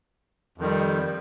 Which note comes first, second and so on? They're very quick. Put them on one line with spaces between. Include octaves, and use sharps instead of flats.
F2 D#3 G3